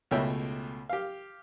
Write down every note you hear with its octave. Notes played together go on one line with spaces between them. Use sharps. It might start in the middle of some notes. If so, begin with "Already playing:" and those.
C#2 B2 A3 C#5 E5 G5
G4 F5